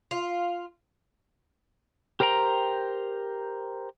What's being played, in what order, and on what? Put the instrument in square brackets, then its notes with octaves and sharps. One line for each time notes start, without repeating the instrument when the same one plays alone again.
[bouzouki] F4
[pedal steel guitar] G4 A#4 C5 G5 A#5